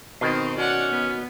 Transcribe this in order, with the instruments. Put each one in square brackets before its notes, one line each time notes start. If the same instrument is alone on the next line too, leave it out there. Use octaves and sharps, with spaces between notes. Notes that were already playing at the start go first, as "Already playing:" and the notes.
[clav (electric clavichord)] B2 D#3 [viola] C4 D#4 [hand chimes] C7 D7
[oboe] C#4 [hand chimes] F#4 [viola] D5 F#5
[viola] B3